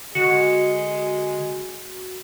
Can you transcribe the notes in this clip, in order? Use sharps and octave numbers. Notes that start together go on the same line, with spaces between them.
D3 G#3 F#4 C#7